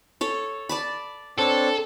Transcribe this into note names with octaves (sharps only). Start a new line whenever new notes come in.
A4 C#5
D5 A5 B5
C4 D4 A4 C#5